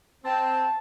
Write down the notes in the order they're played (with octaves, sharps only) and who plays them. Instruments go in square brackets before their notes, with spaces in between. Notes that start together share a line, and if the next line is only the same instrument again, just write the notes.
[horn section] C4 [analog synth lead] A5